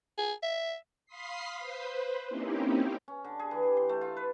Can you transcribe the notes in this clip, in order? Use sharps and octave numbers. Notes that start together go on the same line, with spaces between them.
G#4
E5
F5 B5 C6 D#6 B6 C7
B4 C5
A#3 C4 C#4 D#4 E4 G4
C#4
D3
G#4
E3
G4
C6
A3
F4
B4